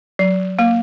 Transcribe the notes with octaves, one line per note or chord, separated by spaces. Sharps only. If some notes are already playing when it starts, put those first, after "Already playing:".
F#3
A#3